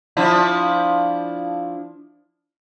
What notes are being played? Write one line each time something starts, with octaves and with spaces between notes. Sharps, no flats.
F3 D4 E4